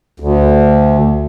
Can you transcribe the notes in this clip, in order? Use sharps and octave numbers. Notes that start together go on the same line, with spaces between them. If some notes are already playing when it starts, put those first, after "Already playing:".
D2